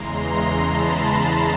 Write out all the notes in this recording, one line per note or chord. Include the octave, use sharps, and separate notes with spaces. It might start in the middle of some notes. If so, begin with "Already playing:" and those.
Already playing: E2 C#3 E3 G#3 A#5 C6
A5 B5